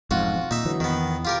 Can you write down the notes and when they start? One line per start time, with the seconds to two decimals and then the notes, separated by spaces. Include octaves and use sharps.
0.11 E1 F2 G#2 F4 F#4
0.51 A#2 D#4 E5
0.65 D3 E3 F#3
0.80 E2 D#3 B3
1.25 F4 G4 A#4